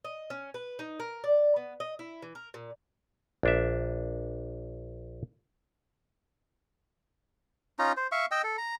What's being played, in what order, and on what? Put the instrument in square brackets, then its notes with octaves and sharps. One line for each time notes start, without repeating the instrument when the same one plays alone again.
[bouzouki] D#5
C#4
B4
D#4
A#4
D5
B3
D#5
E4
E3
A#4
A#2
[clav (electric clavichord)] A#1 D4 E5
[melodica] C#4 D#4 F4 A#5
C5
E5 F5 C#6
D#5 G5 E6
A4
A#5